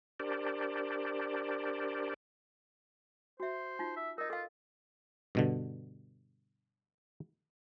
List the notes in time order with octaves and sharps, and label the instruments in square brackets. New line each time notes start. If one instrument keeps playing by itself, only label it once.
[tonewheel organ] D4 G4 A#4 C5 D5
[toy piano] F#4 E5 [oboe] C5
[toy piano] D#4 F4
[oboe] E5
[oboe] D#4 [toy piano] A#4 D#5
[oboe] F4 [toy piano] A4 F5
[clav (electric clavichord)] G2 B2 D3